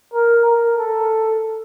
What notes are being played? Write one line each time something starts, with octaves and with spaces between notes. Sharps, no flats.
A#4
A#4
A4